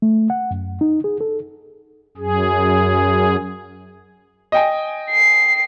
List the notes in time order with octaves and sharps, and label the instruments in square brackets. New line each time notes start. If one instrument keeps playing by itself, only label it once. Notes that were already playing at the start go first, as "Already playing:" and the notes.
[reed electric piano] A3
F#5
F#2
D#4
G#4
A4
[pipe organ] F#2 G#4
[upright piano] D#5 G5 G#5
[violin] C7